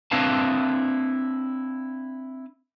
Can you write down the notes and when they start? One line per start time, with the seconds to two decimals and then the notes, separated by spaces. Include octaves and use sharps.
0.11 C4 D4 E4 B4 F5 A5